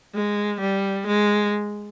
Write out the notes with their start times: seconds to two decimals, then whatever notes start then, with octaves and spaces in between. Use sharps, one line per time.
0.15 G#3
0.60 G3
1.07 G#3